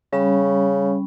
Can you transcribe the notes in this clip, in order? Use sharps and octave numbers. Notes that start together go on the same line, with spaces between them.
C#3 G3 C#4 B5